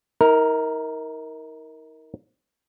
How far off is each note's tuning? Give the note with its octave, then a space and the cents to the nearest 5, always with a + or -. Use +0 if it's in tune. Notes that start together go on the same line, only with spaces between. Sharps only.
D#4 +40 A#4 +0